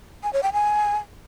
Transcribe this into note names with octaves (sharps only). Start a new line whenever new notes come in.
G#5
C#5
G5
G#5